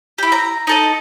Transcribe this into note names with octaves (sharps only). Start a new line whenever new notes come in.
E4 G4
A#5
D#4 A4 D#5